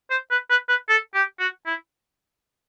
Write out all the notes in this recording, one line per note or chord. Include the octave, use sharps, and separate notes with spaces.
C5
B4
B4
B4
A4
G4
F#4
E4